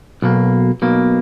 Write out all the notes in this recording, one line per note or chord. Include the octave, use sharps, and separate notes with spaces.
B1 B2 A#3
B1 B2 A#3